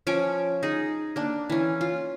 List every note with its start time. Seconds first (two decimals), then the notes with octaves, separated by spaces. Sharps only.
0.07 F3 C#4 C#5 D6
0.63 D#4 G#4
1.16 A#3 D4
1.50 E3 C#4
1.81 F4